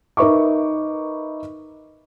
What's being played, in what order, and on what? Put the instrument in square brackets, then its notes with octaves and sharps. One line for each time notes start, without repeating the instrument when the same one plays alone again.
[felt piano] D#4 A#4 B4 E5 C#6 D6